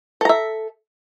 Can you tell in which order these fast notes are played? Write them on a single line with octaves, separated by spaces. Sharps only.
A4 A#5 E5